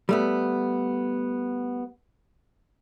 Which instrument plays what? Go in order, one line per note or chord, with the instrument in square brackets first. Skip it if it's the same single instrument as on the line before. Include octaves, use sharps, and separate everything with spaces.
[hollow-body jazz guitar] G3 A3 B3